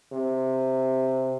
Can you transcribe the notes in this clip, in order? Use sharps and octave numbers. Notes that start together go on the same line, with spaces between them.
C3